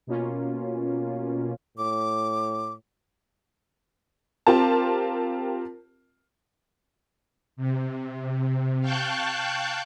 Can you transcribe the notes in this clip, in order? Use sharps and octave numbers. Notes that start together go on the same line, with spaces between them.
B2 A#3 C#4 F4
A2 D6
C4 F4 G4 A#4 A5
C3
F5 G5 A5 C#6 F#6 G6